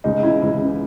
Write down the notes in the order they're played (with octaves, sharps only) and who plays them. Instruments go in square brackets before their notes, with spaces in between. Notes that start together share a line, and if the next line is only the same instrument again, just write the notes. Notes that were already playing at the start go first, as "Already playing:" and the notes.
[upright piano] C#2 D#4
C#3 E3 E4
C#2
C#3 E3